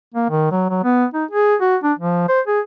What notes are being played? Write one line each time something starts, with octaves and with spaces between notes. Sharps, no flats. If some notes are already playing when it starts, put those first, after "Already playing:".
A#3
D#3
F#3
F#3
B3
D#4
G#4
F#4
D4
F3
C5
G#4